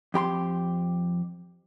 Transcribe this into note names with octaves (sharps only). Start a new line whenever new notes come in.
F2 G4 B5 C6